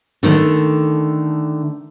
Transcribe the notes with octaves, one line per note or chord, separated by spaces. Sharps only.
D3 D#3 A3